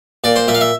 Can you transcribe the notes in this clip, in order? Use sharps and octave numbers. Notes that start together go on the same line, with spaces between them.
A#2 D5
C5
A#2 E5
F5
E5